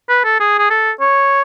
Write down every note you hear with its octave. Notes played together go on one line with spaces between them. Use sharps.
B4
A4
G#4
G#4
A4
C#5